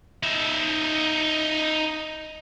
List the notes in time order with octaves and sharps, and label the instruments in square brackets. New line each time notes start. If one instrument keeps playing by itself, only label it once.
[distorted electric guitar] D#4 E5